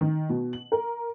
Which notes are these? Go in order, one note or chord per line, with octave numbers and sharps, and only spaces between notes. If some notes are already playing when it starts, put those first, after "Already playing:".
D#3
B2
F#7
A#4